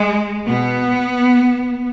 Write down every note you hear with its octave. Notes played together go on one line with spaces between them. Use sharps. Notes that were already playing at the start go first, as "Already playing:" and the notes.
Already playing: G#3
B2 B3